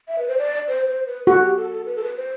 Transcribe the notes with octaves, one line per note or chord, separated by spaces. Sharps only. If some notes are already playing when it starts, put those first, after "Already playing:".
E5
B4
C5
D5
C5
C5
B4
F#4 A4
G4
A4
A4
B4
A4
B4
C5